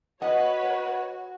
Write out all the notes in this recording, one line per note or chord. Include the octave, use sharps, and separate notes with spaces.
F#4 B4 C#5 D#5 F#5